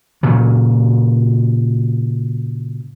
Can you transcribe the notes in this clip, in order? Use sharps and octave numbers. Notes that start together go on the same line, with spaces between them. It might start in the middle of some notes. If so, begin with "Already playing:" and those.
A#2 C#3 F#3